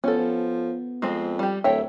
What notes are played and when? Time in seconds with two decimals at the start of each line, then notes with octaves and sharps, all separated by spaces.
0.04 F3 B3 C#4 A4
0.18 F3
1.02 F2 G#3 C4
1.39 G3 G4
1.64 D1 A4 C#5 E5 G5